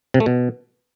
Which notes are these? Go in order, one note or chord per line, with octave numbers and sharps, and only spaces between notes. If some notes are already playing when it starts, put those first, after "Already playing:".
C3
A3
B2